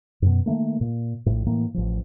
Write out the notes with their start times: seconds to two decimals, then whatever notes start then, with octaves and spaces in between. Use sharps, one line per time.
0.22 F#2 B2
0.46 D#3 E3 A3 A#3
0.81 A#2
1.26 A#1 A2
1.46 A2 E3 A#3
1.74 A1 F3